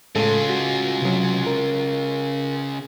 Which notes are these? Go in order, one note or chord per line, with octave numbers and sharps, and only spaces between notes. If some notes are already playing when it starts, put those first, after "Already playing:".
A2 C#3 G#3 F4 A4
F#4
C3 F#3
A#4